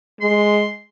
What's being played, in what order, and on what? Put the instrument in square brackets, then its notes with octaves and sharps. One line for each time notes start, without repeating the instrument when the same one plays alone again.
[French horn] G#3 [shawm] C6